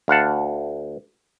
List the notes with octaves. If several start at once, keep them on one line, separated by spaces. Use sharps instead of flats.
D2 F5 F#5 A5